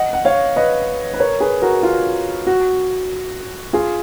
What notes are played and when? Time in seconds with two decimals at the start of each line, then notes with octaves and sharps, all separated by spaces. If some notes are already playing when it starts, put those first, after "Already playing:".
Already playing: D#5 F#5
0.13 F#5
0.25 C#5 F5
0.56 B4 D#5
1.14 B4
1.20 A#4 C#5
1.40 G#4 B4
1.62 F#4 A#4
1.83 F4
2.47 F#4
3.73 F4 G#4